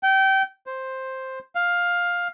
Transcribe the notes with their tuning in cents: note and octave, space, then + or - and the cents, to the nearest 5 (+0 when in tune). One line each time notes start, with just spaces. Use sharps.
G5 -25
C5 +5
F5 +10